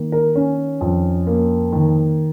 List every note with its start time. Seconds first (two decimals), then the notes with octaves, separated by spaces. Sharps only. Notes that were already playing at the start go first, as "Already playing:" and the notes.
Already playing: D#3 A#3
0.12 A#4
0.35 C#4
0.81 F2
1.27 A#3
1.73 D#3